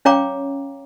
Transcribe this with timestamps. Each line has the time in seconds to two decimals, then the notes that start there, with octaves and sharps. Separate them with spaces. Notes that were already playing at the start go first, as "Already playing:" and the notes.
0.05 C#4 C#5 F5 G5 A#5 D6